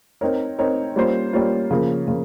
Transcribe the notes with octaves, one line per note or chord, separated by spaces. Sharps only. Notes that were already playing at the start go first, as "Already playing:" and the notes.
C4 D#4 A#4 C#5
C4 D#4 A#4 C#5
G3 A#3 C#4 F4 C5
G3 A#3 C#4 F4 C5
C#3 F3 A#3 F4 A#4
C#3 F3 A#3 F4 A#4